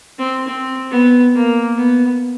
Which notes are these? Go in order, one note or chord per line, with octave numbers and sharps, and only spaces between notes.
C4
C4
B3
A#3
B3